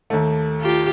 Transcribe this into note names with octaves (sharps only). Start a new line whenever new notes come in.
D#2 A3
F4 G4